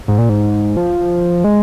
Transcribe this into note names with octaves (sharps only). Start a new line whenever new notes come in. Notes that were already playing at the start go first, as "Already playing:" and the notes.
G#2
A#2
G#2
F3
G#3